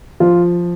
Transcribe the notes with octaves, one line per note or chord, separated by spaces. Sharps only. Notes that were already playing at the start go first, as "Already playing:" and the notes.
F3 F4